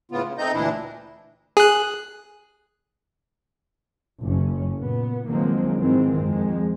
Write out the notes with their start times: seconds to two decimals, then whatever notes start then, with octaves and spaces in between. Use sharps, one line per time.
0.11 A2 C#3 B3 F4
0.25 C#3
0.38 A3 C4 D#4 D#5 G6
0.54 D2 A#2 E3 D4 E4
1.57 G#4 F#6
4.21 F#1 C#4
4.81 A#2 B3
5.28 D#3 F3 F#3 G#3 A#3 C4
5.78 G#2 D#3 E3 G#3 C4
6.22 F2 F3 G#3